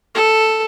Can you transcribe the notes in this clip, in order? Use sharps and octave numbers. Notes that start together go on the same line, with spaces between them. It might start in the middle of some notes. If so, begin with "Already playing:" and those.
A4